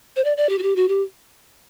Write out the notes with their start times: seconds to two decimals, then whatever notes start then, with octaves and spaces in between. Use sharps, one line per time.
0.16 C5
0.25 D5
0.37 D5
0.49 G4
0.59 F#4
0.63 G4
0.76 F#4
0.89 G4